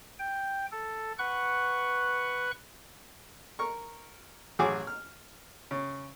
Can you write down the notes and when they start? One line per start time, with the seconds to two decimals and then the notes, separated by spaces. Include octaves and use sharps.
0.19 G5
0.72 A4
1.19 B4 F#5 C#6 F#6
3.59 A#4 C#6
4.59 A1 F#3 F#4 G#4 G#5 D6
4.87 F6
5.71 C#3